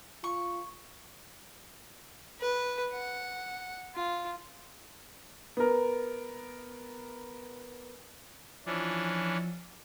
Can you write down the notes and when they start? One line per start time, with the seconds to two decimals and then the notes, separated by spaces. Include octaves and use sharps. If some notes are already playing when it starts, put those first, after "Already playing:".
0.24 F4 C#6
2.41 B4
2.92 F#5
3.95 F4
5.57 B3 A#4
8.66 E3 F3 C#4 D4